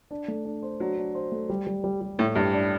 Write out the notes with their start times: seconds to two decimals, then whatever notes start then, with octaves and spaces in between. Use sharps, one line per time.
0.11 D4
0.28 A3
0.45 D4
0.63 C5
0.80 F#3 D4
0.97 D4
1.15 C5
1.32 A3
1.50 G3
1.67 G3
1.84 G3
2.01 G3
2.19 A2 A4
2.35 G2 G3
2.53 D4